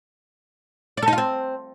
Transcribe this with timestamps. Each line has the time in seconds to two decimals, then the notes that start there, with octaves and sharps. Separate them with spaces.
0.97 D5
1.02 A4
1.08 D#4
1.13 F4
1.18 C4